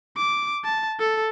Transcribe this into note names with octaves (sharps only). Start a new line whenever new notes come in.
D6
A5
A4